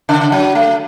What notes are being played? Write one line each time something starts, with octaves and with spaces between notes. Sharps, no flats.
C#3
F#3
A3